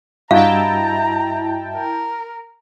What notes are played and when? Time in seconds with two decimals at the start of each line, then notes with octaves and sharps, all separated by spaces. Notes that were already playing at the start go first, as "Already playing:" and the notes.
0.31 G2 E4 F#4 D#5 F5 G5 A5 A#5
1.75 A#4